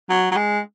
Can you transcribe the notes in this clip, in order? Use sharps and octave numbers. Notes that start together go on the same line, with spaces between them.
F#3
F#3
G#3